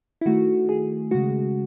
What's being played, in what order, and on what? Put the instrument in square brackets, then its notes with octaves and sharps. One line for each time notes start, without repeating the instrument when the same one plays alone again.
[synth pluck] E4
D#3 A3 F#4
G#4
C#3 G#3 F#4